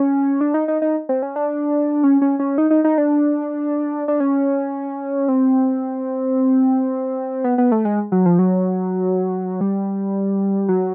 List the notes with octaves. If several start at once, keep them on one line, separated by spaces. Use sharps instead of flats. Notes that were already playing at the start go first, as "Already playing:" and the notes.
Already playing: C#4
D4
D#4
D#4
D#4
C4
C#4
D4
C#4
C#4
C#4
D#4
D#4
D#4
D4
D4
C#4
C4
B3
B3
A3
G#3
F#3
F3
F#3
G3
F#3